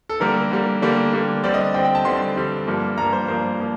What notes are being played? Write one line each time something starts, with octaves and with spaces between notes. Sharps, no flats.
A4
D3 G3 A#3 A#4
D3 G3 A#3
D3 G3 A#3
D3 G3 A#3
D3 G3 C4 D5
D#5
D3 G3 C4 G5
G5
A5
D3 G3 C4 C6
D3 G3 C4
G2 F3 A#3
G2 F3 A#3 A#5
C5
G2 F3 A#3 C5
F3 A#3